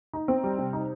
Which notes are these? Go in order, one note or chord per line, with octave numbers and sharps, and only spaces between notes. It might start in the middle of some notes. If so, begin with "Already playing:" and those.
D#4
C4
G3
C3
D#4